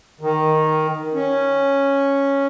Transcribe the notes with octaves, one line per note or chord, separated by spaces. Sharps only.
D#3
C#4